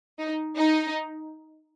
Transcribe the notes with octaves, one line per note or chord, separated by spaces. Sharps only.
D#4
D#4